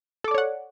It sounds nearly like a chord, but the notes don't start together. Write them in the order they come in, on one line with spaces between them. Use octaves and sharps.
A4 D6 D5 C#5 F#5